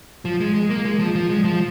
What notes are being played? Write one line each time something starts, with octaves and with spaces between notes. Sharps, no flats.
F3
G#3
G#3
A#3
G#3
F3
F3
G#3
F3